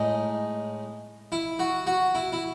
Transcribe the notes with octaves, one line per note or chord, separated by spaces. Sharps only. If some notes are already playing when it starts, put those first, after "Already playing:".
Already playing: A2 G#3 D#4
E4
F#4
F#4
E4
E4